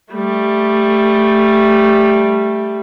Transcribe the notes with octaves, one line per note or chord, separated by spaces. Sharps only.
G3 A3